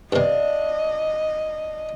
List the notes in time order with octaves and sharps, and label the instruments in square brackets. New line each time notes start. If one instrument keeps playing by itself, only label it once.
[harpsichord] G2 C3 [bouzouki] D4 F5 [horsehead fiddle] D#5